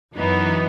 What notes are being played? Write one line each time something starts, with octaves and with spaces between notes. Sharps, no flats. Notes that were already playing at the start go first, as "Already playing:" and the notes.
F#2 E3 B3 D#4